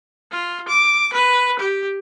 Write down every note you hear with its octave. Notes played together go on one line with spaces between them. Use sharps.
F4
D6
B4
G4